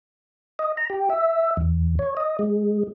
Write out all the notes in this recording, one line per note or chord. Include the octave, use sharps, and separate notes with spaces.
D#5
A#5
G4
E5
E2
C#5
D#5
G#3